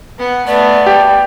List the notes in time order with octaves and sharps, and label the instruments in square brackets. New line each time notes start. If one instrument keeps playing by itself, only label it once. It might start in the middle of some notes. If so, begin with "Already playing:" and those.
[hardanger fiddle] B3 F#5
[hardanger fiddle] A3 B3 [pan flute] D5
[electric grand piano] G4